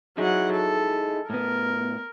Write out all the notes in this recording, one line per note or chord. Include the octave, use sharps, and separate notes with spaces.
F#3 D#4 E4 G#4 F#5
A4
A2 B3 A#4